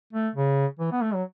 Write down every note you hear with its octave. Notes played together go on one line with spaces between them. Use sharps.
A3
C#3
E3
B3
A3
F#3